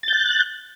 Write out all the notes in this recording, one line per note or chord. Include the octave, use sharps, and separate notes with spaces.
F#6 G6 A6